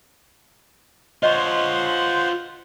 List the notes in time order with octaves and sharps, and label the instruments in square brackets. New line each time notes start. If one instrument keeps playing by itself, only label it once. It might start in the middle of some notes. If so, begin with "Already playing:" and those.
[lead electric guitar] F4 C#5 [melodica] C5 F#5 [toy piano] D#5